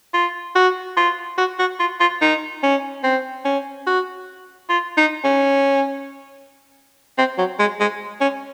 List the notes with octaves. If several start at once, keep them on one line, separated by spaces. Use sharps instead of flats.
F4
F#4
F4
F#4
F#4
F4
F4
D#4
C#4
C4
C#4
F#4
F4
D#4
C#4
C4
F#3
G#3
G#3
C#4